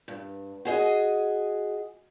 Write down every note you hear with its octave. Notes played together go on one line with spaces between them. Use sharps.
G2
F#4 G#4 D#5